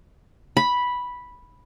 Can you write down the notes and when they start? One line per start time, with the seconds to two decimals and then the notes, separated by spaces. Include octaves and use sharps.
0.57 B5